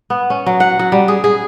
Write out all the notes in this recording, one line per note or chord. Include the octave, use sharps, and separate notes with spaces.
B3
C#4
F#3
F#5
F#3
G3
G#4
G#4